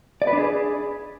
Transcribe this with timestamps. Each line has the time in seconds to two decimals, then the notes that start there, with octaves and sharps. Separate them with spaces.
0.22 D5
0.27 B4
0.33 D4
0.38 G#4